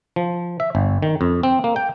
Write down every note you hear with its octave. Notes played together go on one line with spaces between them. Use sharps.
F3
E5
G1
D#3
F2
C4
A#3
G5